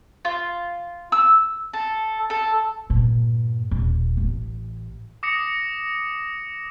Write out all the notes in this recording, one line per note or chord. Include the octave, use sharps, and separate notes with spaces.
F4
E6
A4
A4
G2 A#2
D#1
A1
D6 D#6 A#6 C#7